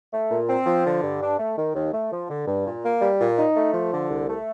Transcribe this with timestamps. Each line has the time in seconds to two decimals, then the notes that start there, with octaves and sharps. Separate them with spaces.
0.11 A3
0.30 A#2
0.48 C4
0.66 F3
0.84 D3
1.02 G2
1.21 D4
1.39 A3
1.56 D#3
1.74 D#2
1.92 A3
2.11 F3
2.29 D3
2.46 G2
2.65 A#2
2.84 A#3
3.01 G3
3.19 A#2
3.38 D#4
3.56 A3
3.73 F3
3.91 D3
4.10 C2
4.28 A3